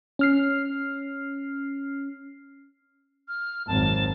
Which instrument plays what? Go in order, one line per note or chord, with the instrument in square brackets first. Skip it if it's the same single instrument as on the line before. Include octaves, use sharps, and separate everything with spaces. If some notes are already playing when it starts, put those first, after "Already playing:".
[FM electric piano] C#4 F6 C7
[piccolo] F6
[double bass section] G#1 F2 [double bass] F#3 C4 [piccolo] A5